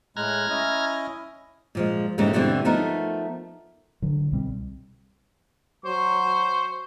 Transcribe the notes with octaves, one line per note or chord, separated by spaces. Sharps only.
A2 G#3 A#5 F6 F#6 G#6
C#4 E4 D#5
A#2 F3 G#3
G#2 C#3 E3 G3 A3 A#3
D2 B2 D3 E3 G3 C4
F3 A3 B3 D#4 A#4 B4
D3 F#3
C2 B2 G3 C4
F#3 C5 C#6